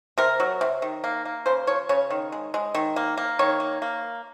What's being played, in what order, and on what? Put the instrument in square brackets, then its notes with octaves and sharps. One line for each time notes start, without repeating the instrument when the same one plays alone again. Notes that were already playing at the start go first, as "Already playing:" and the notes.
[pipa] C3 A#4
F#3
C3
D#3
A#3
A#3
C#3 C5
F3 C#5
C#3 C#5
D#3
G#3
G#3
D#3
A#3
A#3
D#3 C#5
A#3
A#3